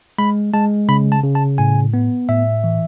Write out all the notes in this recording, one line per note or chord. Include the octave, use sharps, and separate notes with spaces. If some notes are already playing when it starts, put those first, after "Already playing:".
G#3 B5
G#3 A5
C#3 B5
A5
C#3
A5
A2 G#5
B3
A2 E5
E3